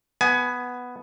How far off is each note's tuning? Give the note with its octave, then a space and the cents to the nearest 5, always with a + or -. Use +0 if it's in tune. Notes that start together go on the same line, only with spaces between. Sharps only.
B3 +0 G#5 +25